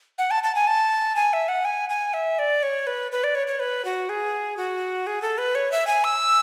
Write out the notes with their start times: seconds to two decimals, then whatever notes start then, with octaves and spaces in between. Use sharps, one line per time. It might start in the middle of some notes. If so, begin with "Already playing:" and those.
0.18 F#5
0.31 A5
0.43 A5
0.55 G#5
0.67 A5
1.16 G#5
1.33 E5
1.48 F#5
1.65 G#5
1.89 G#5
2.14 E5
2.39 D5
2.63 C#5
2.87 B4
3.12 B4
3.24 D5
3.35 C#5
3.47 C#5
3.60 B4
3.85 F#4
4.09 G#4
4.57 F#4
5.07 G#4
5.22 A4
5.38 B4
5.55 C#5
5.72 E5
5.87 G#5
6.04 E6